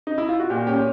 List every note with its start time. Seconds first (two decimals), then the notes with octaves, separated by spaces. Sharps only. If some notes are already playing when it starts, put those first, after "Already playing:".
0.07 D#4
0.18 E4
0.29 F4
0.39 F#4
0.50 A#2 G4
0.67 C#4 G4